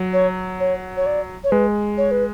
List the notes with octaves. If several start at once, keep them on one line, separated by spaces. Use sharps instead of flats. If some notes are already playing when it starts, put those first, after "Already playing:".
Already playing: F#3
C#5
C#5
C#5
D5
C#5
G#3 B4
C#5
B4